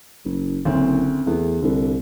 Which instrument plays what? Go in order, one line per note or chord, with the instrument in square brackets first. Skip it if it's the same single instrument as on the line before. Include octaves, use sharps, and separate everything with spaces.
[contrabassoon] F#1
[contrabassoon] F#1 [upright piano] D2 C4 C#4
[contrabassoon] E2 [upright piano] A3 B3
[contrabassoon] C2 [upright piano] D3